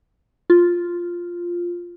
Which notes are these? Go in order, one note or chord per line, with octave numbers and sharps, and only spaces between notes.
F4